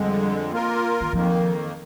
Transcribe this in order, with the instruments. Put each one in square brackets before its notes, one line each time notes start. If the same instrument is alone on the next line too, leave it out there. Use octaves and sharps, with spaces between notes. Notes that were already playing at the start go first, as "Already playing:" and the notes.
Already playing: [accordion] F2 D3 G#3 [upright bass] G3
[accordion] A#3 F4 A#4
[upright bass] D#3
[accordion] F2 D#3 A#3 [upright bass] F3